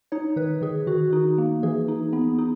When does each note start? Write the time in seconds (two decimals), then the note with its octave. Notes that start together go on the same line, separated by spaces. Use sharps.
0.12 D#4 C#5
0.36 D#3 B4
0.62 D#3 G#4
0.87 D#3 F#4
1.13 D#4
1.38 A#3
1.63 E3 G#4
1.88 D#4
2.13 B3
2.38 D#4